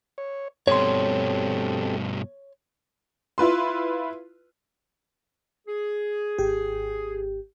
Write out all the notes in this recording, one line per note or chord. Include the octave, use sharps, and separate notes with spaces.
C#5
G2 B2 C4 G4 A4 C#5 C6
E4 F4 B4 C6
G#4
G#1 G4